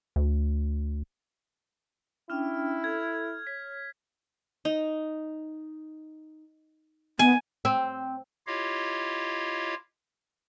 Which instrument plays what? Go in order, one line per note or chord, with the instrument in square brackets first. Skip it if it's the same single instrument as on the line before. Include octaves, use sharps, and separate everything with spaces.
[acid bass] D2
[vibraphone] C#4 D4 G5 [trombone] E4 [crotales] F6
[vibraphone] A4 [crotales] G#6
[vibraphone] C#5 [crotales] B6
[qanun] D#4
[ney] B3 [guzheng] G#5
[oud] C4
[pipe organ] E4 F4 G4 C#5 D#5 F5